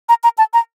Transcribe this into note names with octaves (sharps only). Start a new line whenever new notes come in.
A#5
A#5
A5
A#5